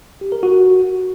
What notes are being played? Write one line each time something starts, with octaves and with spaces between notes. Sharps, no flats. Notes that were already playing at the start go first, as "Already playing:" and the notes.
G4
A#4
F#4